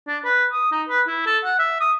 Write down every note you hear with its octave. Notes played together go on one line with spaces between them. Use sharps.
D4
B4
D#6
D#4
B4
E4
A4
F#5
E5
D#6